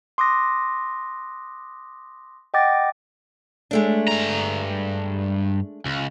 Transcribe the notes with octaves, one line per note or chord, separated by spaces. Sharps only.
C6 D6 D#6 F#6 A#6
D#5 F#5 G5 D6 A6 A#6
G#3 A3 D4
G2 A#5
C#2